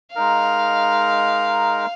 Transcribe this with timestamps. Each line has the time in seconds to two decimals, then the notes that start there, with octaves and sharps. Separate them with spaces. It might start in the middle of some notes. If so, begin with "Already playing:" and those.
0.14 G#3 D#4 A#4 F5